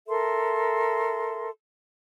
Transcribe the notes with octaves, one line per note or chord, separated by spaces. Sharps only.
A4 A#4 E5 C6